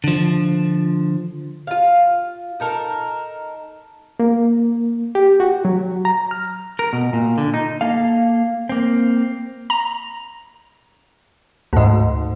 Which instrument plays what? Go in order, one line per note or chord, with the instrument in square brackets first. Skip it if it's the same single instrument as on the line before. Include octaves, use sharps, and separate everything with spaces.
[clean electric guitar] D3 F3
[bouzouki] F4 F5
D#4 A4 A#4
[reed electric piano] A#3
G4
F#4
F#3
A#5
F6
[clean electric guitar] A#4
B2
A#2
D3
D#4
[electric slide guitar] A#3 A4 F5
A#3 C4
[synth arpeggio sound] A#5
D2 G#2